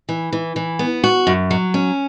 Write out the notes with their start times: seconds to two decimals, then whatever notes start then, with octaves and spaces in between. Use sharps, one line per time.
0.09 E3
0.33 E3
0.56 E3
0.79 B3
1.04 F#4
1.27 F#2
1.51 F#3
1.74 C#4